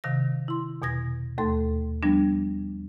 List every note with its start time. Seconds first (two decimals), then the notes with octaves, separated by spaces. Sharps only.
0.04 C3 D#3 F5 A#6
0.48 E4 C6
0.82 E2 B2 G#6 A#6
1.38 D#2 A3 A4 C6
2.03 F3 G3 B3 D4